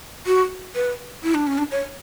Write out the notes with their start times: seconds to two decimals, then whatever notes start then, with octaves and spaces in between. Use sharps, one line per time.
0.26 F#4
0.75 B4
1.23 E4
1.34 D4
1.47 C#4
1.58 D4
1.71 C#5